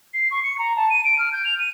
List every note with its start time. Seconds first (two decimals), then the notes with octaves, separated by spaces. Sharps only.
0.14 C7
0.31 C#6
0.43 C#7
0.58 A#5
0.76 A5
0.90 D#7
1.05 D7
1.19 F6
1.33 G6
1.45 F7
1.59 D#7